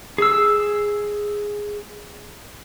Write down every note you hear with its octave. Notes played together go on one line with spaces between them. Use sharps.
G#4 E6